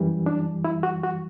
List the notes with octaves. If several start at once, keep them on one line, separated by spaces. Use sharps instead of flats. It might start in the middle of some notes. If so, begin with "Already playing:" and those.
Already playing: F#2 E3 G3
D4
E4
F#4
F#4